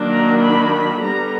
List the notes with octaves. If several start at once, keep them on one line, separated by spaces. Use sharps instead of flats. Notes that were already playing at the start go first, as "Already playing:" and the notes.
Already playing: D#3 F#3 A#3 D4
A#5
B5
B5
D3 G3 B3 A#5